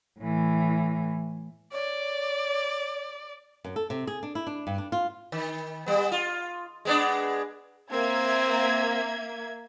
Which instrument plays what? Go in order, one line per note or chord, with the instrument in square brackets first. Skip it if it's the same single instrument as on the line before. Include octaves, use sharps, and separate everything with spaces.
[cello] A2 E3
[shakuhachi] C#5 [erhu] D5
[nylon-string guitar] F#2
A4
C3
G#4
D4
E4
D4
G2
D4
F4
[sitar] D#3
G3 B3
F4
G#3 B3 D4
[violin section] A#3 E5 G#6 [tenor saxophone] C4